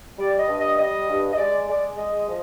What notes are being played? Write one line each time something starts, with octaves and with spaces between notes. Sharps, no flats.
G3 D5
D#5
G2
D#5
G3 D#5
G2
D#5
G#3 D5
G#3 D5
G#3 D#5
F3